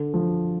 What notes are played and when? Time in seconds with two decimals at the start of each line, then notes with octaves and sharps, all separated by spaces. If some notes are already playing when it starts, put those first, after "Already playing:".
Already playing: D3
0.14 F3